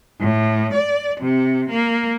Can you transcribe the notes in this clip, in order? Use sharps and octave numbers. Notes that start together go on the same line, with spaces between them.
A2
D5
C3
A#3